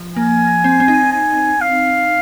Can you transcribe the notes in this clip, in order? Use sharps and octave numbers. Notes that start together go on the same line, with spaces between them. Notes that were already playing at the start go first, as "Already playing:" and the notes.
Already playing: F3
A#3 G#5
C4
C4
D#4
G#5
F5